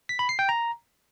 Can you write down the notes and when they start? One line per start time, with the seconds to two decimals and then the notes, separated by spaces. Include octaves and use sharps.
0.09 B6
0.19 B5
0.29 C7
0.39 G5
0.49 A#5